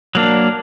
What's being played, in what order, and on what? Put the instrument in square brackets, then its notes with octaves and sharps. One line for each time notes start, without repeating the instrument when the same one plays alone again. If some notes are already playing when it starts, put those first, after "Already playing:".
[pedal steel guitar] F#3 A#3 D4